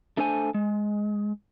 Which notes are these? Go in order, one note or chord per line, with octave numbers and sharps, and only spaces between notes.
A3 D4 A4 C5 G#5
G#3